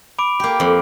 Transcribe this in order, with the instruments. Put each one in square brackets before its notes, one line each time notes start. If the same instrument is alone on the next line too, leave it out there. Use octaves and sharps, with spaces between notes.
[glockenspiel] B5 D6 D7
[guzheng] A#3 G4
F2